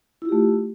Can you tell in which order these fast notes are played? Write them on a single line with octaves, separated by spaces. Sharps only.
E4 F4 G4 A3